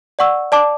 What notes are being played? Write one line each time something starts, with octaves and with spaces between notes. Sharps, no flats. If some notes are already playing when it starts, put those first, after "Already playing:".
D5 F#5 C#6 E6
D5 A5 D6